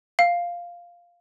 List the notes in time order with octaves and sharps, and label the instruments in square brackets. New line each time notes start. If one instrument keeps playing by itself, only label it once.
[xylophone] F5